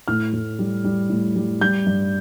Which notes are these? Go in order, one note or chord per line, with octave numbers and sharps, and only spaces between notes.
A2 F6
A2
G3
G3
A2
G3
G3 G6
G2